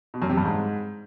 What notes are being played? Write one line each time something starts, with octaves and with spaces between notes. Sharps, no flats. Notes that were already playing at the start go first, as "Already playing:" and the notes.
B2
F#2
C3
G2
G#2